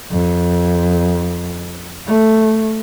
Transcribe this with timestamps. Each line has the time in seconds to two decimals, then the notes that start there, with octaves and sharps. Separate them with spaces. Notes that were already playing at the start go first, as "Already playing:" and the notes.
0.11 F2
2.08 A3